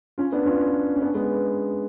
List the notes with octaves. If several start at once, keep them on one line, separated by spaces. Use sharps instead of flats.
C#4 F4
B3 D4
C#4 F4
C#4
B3 D4
G#3 B3